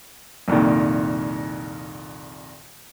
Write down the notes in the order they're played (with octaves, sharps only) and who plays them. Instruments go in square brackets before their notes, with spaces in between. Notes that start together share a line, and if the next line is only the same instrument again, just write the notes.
[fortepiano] C2 F2 A#2 D#3